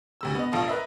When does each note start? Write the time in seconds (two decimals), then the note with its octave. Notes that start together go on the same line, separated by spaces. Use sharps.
0.21 D2 C3 E6
0.35 B3 D#5
0.52 F1 A#1 F4 A4 D#6
0.68 A#4 B4 D#5 E5